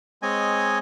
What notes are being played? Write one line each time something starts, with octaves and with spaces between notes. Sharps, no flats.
G#3 C4 C#5 D#5 G#5